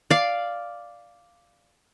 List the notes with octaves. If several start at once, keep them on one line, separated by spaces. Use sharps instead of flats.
D5 F5